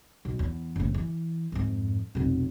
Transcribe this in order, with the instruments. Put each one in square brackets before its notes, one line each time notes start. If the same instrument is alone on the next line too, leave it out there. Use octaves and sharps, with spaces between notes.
[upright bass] B1
E2
F#1 A2
E3
F2 G#2
F1 B1